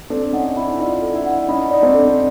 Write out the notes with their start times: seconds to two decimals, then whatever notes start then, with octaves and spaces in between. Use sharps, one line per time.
0.10 C4 D4 A4
0.33 C#4 D#4 F#5
0.56 D4 E4 B5
0.79 D#4 F4 D5
1.02 A4
1.13 D4 E4
1.26 F#5
1.48 C#4 D#4 B5
1.71 D#4 D5
1.83 C4 D4
1.94 A4